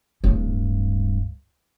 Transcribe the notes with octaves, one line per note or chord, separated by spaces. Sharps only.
D1 G2